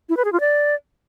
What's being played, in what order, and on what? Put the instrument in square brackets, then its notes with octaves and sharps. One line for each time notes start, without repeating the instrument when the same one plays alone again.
[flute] E4
B4
G#4
F4
D5